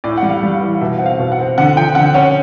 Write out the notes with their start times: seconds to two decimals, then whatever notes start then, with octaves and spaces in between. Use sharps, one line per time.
0.04 A2 D5
0.18 F#5
0.23 G3
0.29 F5
0.43 G3
0.55 F5
0.61 E3
0.75 F5
0.81 B2 E5
0.98 C4 F#5
1.06 F5
1.19 B2
1.32 F#5
1.39 C4
1.58 D3 F#5
1.76 F3 G5
1.95 D3 F#5
2.14 C#4 F#5